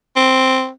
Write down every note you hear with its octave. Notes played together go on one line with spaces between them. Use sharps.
C4